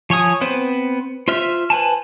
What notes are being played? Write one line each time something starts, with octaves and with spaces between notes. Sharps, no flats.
F3 C#5 G#5 D#6
B3 C4 B4 C5
F4 C5 E5 F6
B4 C5 G#5 A5